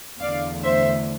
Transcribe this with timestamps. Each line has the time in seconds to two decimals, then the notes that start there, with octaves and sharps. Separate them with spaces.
0.20 E2 D3 A3 D5 F5
0.63 C5 E5